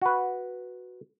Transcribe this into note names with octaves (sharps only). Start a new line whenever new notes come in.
F#4 B4